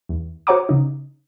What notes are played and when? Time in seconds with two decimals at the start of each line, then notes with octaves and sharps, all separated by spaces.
0.09 E2
0.47 F#4 C5 C#5 F#5 A#5 D6
0.69 C#3 D#4